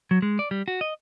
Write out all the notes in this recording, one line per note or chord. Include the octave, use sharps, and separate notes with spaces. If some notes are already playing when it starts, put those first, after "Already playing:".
F#3
G#3
D5
G3
F#4
D#5